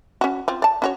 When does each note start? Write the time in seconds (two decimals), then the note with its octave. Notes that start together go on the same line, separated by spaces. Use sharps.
0.21 C#4 F#4
0.48 C4 F4
0.62 D5 A5
0.82 C#4 F#4 C#5